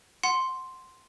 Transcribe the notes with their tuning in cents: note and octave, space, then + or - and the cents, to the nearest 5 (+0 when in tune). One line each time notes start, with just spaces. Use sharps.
F#5 +0 C6 +0